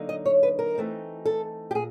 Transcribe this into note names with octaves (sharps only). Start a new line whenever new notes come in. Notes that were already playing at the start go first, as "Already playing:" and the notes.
Already playing: D3 F#3 A#3 D#4
D#5
C#5
B4
A#4
E3 A3 C4 D#4
A4
G4
A#2 G#4